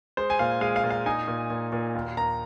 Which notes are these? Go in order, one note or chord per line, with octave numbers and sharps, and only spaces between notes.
G#3 C5
G#5
A#2 F5
G#3 F5
F5
A#2
F5
D#4 G#5
A#2
A#2
A#2
D#2
D#2 A#5